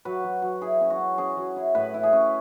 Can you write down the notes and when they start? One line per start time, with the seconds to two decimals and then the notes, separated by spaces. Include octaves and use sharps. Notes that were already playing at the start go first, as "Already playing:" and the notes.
0.05 F#3 B4
0.24 F#3
0.42 F#3
0.61 E4 G#4
0.81 C#4
0.90 F#4
0.99 C#4
1.18 C#4 G#4
1.37 F#3
1.56 E4
1.75 A2 B4
1.94 E4
2.03 G#4
2.13 C#4